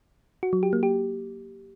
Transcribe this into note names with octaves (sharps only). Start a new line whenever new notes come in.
F#4
F#3
G4
A#3
G4